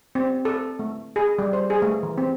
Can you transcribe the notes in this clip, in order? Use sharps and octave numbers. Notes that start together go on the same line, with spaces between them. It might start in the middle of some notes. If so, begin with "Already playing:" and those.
C4
A4
A3
G#4
G3
C5
G#4
A3
E3
C4